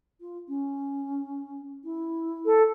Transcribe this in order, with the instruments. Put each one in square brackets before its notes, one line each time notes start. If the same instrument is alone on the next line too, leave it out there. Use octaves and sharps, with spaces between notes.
[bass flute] F4
C#4
E4
[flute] A4